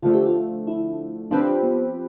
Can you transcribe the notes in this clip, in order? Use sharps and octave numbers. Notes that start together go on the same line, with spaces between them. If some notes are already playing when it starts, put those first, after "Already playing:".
D3 F3 A3 F4
G4
F4
E4
F3 C4 D4 G4 B4
B3